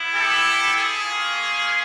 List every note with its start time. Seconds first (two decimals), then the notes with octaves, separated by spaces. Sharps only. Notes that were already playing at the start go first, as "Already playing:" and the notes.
Already playing: B3 E4
0.14 G4 A4
0.74 G#4
1.04 A#3 C#4 F4